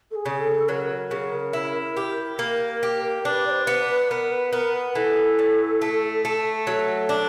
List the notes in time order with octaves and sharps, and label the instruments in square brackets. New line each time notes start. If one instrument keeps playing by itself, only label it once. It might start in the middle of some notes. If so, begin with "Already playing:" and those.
[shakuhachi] A4
G#4
[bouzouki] C#3
[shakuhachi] A4
[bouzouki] F#3 [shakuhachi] A#4
[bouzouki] C#3
E4
G4
[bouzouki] A#3 [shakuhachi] A#4
[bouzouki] G4
[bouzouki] D4 [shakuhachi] B4
[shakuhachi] D5
C5
[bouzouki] B3 [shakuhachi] B4
[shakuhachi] B4
[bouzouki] B3 [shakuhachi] A#4
[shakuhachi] B4
[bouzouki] B3 [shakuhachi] A#4
[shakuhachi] B4
[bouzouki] E3 [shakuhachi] A4
[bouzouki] A2
A3
A3
[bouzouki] F#3 [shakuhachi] A4
[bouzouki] D4